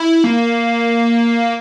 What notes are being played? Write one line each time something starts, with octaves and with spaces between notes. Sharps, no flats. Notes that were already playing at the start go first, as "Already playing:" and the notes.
Already playing: E4
A#3